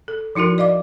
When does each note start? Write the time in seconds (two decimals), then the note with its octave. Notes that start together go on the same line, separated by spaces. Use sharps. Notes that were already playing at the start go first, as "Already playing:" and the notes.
0.08 A4
0.35 F3 D#4 E4 F#4 A#4
0.58 D5 D#5 F5 D6